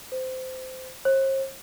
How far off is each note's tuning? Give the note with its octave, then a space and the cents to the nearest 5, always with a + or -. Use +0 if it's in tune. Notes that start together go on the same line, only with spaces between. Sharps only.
C5 -20
C5 +45